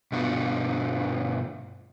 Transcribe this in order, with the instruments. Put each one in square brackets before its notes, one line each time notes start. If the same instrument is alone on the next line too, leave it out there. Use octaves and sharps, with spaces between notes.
[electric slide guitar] G2 B2 B3 D4 F4